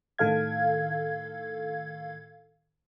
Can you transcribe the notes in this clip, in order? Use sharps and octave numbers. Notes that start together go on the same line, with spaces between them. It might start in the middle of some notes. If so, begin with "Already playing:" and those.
A2 D#3 A4 F5 G#6